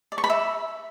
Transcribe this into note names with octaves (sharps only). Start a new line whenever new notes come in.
D5
C#6
B5
E5